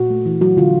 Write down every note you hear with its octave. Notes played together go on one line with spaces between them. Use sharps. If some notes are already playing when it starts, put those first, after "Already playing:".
Already playing: A#2 F#4
A3
E3
F#3 F#4
D3 F4